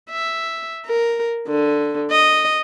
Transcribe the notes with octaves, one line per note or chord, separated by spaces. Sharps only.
E5
A#4
D3
D#5